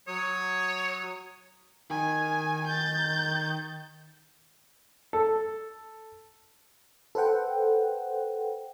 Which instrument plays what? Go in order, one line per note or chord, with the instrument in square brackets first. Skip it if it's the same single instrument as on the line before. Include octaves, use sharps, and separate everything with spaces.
[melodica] F#3 D#6 [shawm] C#5
[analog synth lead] D#3 [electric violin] G#5
[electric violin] G6 A6
[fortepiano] A4
[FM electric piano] A4 B4 C5 F#5 G5